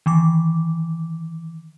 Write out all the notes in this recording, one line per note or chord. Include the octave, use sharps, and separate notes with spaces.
D#3 E3 D6